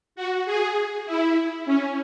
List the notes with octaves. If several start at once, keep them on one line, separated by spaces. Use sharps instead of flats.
F#4
G#4
E4
C#4